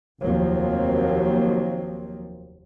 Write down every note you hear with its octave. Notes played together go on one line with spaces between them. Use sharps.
F1 D#2 F3 F#3 A#3 C4